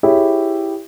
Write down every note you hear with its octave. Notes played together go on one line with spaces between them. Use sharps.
E4 G4 G#4 C#5